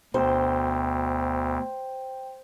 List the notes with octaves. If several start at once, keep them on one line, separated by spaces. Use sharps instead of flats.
D2 B2 C5 G5